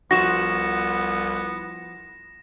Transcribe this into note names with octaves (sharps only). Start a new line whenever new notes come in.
C2 F3 B3 F#4 A#6 E7